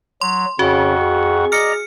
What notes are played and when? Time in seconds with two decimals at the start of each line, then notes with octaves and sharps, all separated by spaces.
0.21 F#3 C6
0.59 F2 C#3 F#4 F#5 C#6
1.01 G#4
1.52 D5 D#5 A#5 F6 C#7